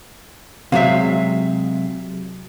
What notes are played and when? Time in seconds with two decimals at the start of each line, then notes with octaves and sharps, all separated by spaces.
0.72 C3 F#3 G#3 E5 F5